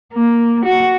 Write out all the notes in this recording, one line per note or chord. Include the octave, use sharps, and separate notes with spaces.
A#3
F#4